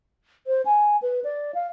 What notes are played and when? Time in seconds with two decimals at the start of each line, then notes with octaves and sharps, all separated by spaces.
0.47 C5
0.66 G#5
1.02 B4
1.24 D5
1.55 F5